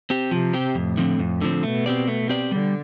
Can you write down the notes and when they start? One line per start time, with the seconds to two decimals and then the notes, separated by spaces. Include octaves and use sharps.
0.10 C4 G4
0.31 C3 F3
0.54 C4 G4
0.75 F2 A2
0.97 D3 F3 C4
1.19 F2
1.41 D3 F3 C4
1.63 B2 A3
1.86 C4 G4 D5
2.08 A3
2.29 C4 G4 D5
2.51 D3 G3